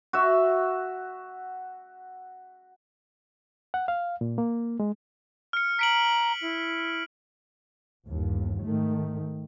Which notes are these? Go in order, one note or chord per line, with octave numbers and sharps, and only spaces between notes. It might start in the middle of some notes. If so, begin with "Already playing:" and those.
F#4 E5
F#5
F5
A#2
A#3
G#3
F6 C#7
A#5 B6 D7 F#7
E4
G1 D#2
G#2 D#3 A3